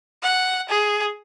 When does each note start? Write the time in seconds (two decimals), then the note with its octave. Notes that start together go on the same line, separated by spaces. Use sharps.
0.23 F#5
0.69 G#4